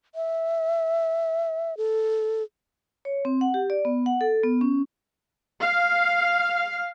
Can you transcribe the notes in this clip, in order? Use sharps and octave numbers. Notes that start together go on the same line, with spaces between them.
E5
A4
C#5
C4
F#5
G4
D5
B3
F#5
A4
B3
C#4
F5